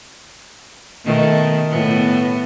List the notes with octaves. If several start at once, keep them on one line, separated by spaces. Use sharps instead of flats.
B2 D#3 A3
A2 B3